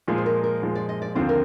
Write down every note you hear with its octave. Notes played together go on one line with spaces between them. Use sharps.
A#2 F3 G#3 G#4
C5
A#4
A#4
A#2 F3 G#3
D5
D#5
D5
D#2 D3 F3 C4 C5
A#4